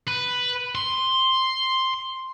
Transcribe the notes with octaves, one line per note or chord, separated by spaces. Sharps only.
B4
C6